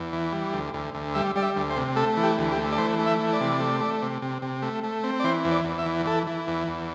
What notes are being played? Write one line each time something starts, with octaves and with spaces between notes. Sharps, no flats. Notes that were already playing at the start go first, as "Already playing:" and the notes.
Already playing: E2
E3
G3
D2
D2
D2
G3 E5
G3 D5
E5
D2
C5
C3
A3 A4
E3
G4
D2
G4
A3
D5
E3 C5
A3
E5
E3
D5
C3
A3
A3
C3
C3
C3
A3
A3
C4
D5
E3 C5
E2
D5
E2
E5
E3
E3 A4
E3
E2
E2